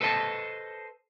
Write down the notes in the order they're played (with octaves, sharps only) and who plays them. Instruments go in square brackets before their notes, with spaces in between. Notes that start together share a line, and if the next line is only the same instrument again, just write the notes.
[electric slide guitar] A4 B4 C5 D#5 A5